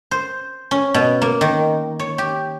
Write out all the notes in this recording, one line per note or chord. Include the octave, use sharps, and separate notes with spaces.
C5
C#4
B2
A#3
D#3
C#5
G4